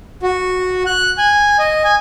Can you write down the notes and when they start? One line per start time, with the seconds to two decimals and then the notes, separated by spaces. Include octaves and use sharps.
0.23 F#4
0.86 F#6
1.18 G#5
1.59 D#5
1.84 G#5